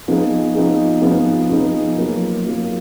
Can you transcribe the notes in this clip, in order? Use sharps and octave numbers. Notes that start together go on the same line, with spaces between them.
F3 B3 D#4 G#4
F3 B3 D#4 G#4
F3 B3 D#4 G#4
F3 B3 D#4 G#4
F#3 A#3 F4
F#3 A#3 F4